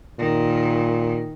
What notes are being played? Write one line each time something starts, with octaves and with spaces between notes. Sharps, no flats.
A#2 D#3